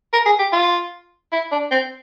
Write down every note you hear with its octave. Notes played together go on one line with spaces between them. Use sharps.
A#4
G#4
G4
F4
E4
D4
C4